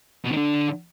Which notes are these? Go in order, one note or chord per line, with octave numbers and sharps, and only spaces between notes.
B2
D#3
D3